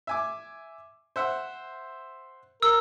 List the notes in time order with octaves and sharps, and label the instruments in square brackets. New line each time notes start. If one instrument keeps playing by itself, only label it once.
[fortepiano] E5 G#5 D6
C5 E5 F#5
[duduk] A#4 [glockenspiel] E6